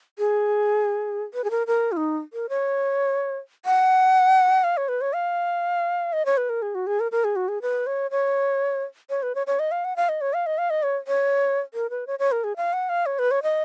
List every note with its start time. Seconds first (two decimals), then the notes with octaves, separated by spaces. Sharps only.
0.19 G#4
1.34 B4
1.44 G#4
1.51 A#4
1.67 A#4
1.92 F4
1.97 D#4
2.33 A#4
2.49 C#5
3.65 F#5
4.64 F5
4.77 C#5
4.89 B4
5.01 C#5
5.13 F5
6.13 D#5
6.26 C#5
6.37 B4
6.49 A#4
6.62 G#4
6.75 F#4
6.87 G#4
7.00 A#4
7.12 A#4
7.24 G#4
7.36 F#4
7.48 G#4
7.62 B4
7.87 C#5
8.11 C#5
9.10 C#5
9.23 B4
9.35 C#5
9.47 C#5
9.59 D#5
9.71 F5
9.85 F#5
9.96 F5
10.09 D#5
10.21 C#5
10.34 F5
10.46 D#5
10.58 F5
10.70 D#5
10.83 C#5
11.07 C#5
11.74 A#4
11.90 B4
12.07 C#5
12.19 C#5
12.32 A#4
12.44 G#4
12.56 F5
12.73 F#5
12.89 F5
13.06 C#5
13.19 B4
13.31 C#5
13.43 D#5